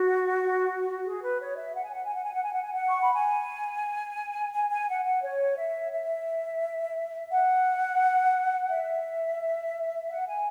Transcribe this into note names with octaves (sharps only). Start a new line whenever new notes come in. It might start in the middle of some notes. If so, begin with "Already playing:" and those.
Already playing: F#4
G#4
B4
C#5
E5
F#5
G#5
F#5
G#5
F#5
G#5
F#5
G#5
F#5
G#5
F#5
C#6
B5
G#5
G#5
G#5
F#5
F#5
C#5
E5
E5
F#5
E5
F#5
G#5